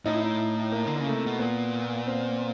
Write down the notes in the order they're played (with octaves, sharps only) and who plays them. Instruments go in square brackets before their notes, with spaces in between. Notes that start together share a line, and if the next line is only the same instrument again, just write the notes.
[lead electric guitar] A2 [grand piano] D#4
[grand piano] E4
D#4
A#3
[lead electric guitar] D3
[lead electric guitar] C#3 [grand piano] A#3
[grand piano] A3
[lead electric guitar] C3
B2
[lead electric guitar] A#2 [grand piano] B3
[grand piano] C4